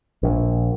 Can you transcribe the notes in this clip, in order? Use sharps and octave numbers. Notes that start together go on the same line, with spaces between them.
A#1